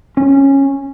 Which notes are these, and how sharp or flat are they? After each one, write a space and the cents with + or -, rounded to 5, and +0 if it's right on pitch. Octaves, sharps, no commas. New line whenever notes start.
C#4 -15